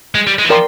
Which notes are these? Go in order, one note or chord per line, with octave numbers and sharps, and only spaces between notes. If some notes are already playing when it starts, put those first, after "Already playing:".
G#3
G3
G#3
E3
F3 A#4 D5 G5 C6